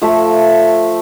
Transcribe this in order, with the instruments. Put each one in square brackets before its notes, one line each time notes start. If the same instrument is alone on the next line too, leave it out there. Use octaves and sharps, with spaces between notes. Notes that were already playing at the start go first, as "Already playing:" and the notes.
[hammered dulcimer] F3 A3 E5 A5